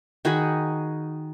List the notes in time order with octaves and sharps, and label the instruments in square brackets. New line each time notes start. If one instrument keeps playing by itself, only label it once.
[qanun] D#3 F#4 G#4 B5